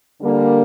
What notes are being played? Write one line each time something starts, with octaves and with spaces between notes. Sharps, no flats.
D3 G3 A#3